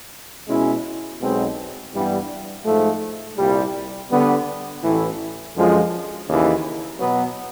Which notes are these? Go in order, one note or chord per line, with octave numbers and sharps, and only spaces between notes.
B2 G#3 C#4 E4
B1 B2 G#3 C4
G2 E3 G3 B3
G#2 F3 A3
C2 A#2 G3
D3 G3 B3
A1 A2 E3
F#2 D3 F3 G#3
D#2 C#3 E3
B2 F#3 B3